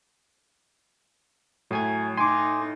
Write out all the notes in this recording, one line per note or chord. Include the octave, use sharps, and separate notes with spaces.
A2 F#3 G#5 G#6
D#4 G#5 C6 D6